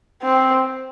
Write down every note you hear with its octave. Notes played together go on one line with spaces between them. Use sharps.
C4